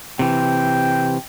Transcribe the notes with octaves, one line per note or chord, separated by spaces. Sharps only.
C3 E3 G5